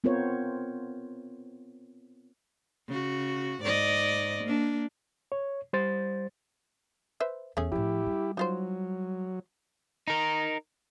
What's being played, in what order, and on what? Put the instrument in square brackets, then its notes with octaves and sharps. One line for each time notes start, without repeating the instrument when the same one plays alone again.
[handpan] B3 C4 F4 A#4 C5 C#5
[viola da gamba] C#3 F#4
G#2 D5 D#5
A#3 D4
[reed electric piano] C#5
G3 C5 A6
[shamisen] B4 C5 E5
[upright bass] E2 [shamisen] A3 C#4 G#4
[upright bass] A2 F3 [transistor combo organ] E4 G4
[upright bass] G3
[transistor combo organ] F#3 [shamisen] D#4 F4 C5
[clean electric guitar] D#4 A#4